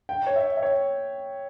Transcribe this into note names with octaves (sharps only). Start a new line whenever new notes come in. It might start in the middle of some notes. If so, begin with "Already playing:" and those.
G5
C#5
E5
E5
C#5